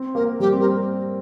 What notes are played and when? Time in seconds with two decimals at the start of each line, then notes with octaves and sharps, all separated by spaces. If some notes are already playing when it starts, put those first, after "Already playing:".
Already playing: C4
0.15 A#3 A#4
0.40 G3 G4
0.53 C4
0.61 A#4